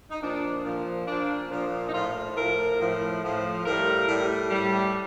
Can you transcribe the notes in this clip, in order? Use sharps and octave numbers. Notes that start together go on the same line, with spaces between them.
D#4
A#2 F3 D4
A#2 F3
A#2 F3 D4
A#2 F3
D#4
A2 F3 F4
A2 F3 A#4
A2 F3
A2 F3
A2 G3 A#4
A2 G3
A2 G3